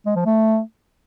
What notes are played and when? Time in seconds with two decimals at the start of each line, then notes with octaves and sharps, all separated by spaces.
0.06 G#3
0.16 F3
0.26 A3